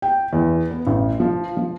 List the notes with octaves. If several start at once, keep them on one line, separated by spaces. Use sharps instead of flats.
G5
E2
B3
A1
F3
F3